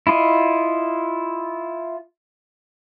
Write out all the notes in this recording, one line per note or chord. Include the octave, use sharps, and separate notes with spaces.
E4 F4 D#5